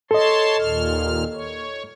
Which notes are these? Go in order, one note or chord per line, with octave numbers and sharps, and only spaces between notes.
A4 C#5 D#5 A5 C6
D#2 A#2 F6
C#5